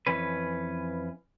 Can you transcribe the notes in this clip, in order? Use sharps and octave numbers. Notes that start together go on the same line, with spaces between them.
F2 E3 C#4 B4